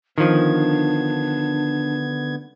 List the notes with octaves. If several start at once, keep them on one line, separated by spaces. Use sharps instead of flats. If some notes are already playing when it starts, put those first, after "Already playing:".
D3 D#3 F3 B3 D4 G#6